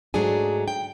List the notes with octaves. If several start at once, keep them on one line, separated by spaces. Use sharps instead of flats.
G#2 F#3 A3 D4 G#4 G#5
G5